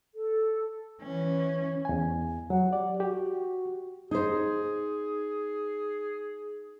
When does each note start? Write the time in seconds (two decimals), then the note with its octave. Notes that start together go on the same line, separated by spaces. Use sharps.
0.15 A4
1.02 E3 C#4
1.85 E2 G#5
2.50 F#3 F#5
2.73 G4 D5
3.00 F#4 G4
4.11 D#4 G#4 C5